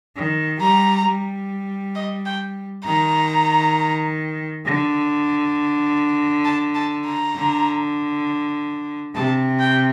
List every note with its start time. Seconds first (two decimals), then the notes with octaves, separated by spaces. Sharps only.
0.16 D#3
0.60 G3 A#5
1.05 G3
1.95 D#5
2.26 G5
2.85 D#3 A#5
4.66 D3
6.45 A5
6.75 A5
7.05 A#5
7.36 D3
9.15 C3 A5
9.60 G5